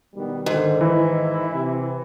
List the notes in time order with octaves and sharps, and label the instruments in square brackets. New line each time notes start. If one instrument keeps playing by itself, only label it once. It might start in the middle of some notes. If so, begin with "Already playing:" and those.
[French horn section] B2 D#3 G3 [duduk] B3
[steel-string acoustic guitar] G#2 [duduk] D3 [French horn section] D#3
[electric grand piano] E3 [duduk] E4
[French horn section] C3